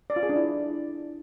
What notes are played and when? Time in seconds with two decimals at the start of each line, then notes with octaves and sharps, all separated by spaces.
0.10 D5
0.16 F4
0.23 G#4
0.29 D4
0.36 E4